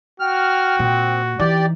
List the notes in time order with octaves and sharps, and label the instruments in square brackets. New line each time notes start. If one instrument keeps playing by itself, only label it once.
[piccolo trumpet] F#4 [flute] G5 [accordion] F6
[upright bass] A#2 [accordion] C4
[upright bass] E3 [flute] D#4 [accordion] G4 D5